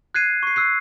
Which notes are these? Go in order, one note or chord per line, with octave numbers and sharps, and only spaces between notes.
F#6 G#6 C7 D#7
C#6 C7
E6 F#6 C7